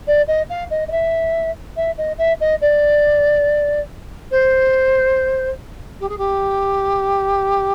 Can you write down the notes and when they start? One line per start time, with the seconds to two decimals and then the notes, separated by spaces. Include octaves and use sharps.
0.07 D5
0.27 D#5
0.49 F5
0.70 D#5
0.88 D#5
0.91 E5
1.76 E5
1.97 D#5
2.18 E5
2.40 D#5
2.61 D5
4.31 C5
6.00 G4
6.09 G#4
6.18 G4